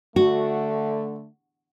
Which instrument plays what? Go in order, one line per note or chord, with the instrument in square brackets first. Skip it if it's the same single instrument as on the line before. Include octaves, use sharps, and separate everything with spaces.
[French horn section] D3 A3 [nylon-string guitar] F#4